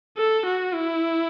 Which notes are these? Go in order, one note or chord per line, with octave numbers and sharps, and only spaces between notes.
A4
F#4
E4